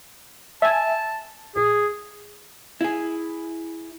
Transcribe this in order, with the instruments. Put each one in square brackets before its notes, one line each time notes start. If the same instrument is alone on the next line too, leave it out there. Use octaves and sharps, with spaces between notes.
[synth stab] E5 G#5 [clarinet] A5
[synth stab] A#1 [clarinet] G#4
[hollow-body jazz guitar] E4 G#4